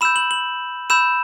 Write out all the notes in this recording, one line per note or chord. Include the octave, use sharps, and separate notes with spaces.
B5 E6 G6 E7
F#7
F#7
B5 E6 G6 E7